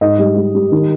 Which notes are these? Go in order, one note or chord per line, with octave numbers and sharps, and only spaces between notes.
G#2 D#5
G3
G3
G3
D#3